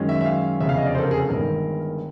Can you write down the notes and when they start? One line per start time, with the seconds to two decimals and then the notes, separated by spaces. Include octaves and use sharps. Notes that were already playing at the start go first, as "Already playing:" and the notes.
Already playing: F#2 D#3 G#3 C#4
0.09 E5
0.21 E5
0.26 F5
0.60 F1 E2 C#3 E5
0.69 F5
0.77 D#5
0.86 D5
0.95 C5
0.98 A4
1.03 A#4
1.11 G#4
1.20 A4
1.29 G1 G2 D#3 G#3 A#4